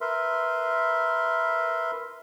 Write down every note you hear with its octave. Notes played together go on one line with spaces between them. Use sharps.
A#4 B4 E5 C6